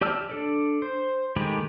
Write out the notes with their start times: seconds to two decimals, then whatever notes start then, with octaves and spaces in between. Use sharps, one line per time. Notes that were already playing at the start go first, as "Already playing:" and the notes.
0.01 G4 D5 A5 E6 F6
0.30 D4 A4 D5
0.82 C5
1.36 D#3 G#3 A3 G4 B5